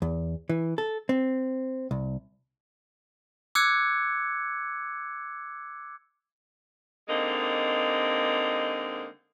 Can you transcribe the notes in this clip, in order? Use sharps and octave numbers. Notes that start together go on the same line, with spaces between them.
E2
E3
A4
C4
C2
D6 E6 F#6 G#6 C#7
D3 G#3 A#3 C4 D#4